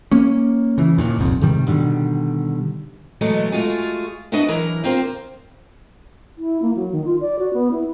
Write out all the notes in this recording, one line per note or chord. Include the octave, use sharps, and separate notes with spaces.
A#3 C#4
C#3 E3
D#2 A#2 D#3
D#1 C2 F2
G#2 C3 D#3 G3
B2 D3 D#3 G3
B2 E3 F#3 G#3 A3 B3
G#3 A3 F4 F#4 G#4
D4 E4 F#4 B4 D#5
E3 F#3 E4 A#4
A#3 C4 F4 A#4 C5
E4
A#3
F#3
D#3
F4
D5
F#4
B3
E4